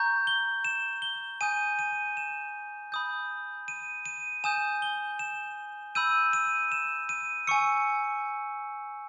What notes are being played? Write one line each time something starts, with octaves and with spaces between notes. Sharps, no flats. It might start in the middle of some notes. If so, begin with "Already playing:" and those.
Already playing: A#5 C#6 G6
G7
E7
G7
G#5 D#6 G6 D#7
D#7
E7
B5 D#6 G6
D#7
D#7
G#5 D#6 G6 E7
G7
E7
B5 E6 G6 D#7
D#7
E7
D#7
G#5 C#6 E6 C#7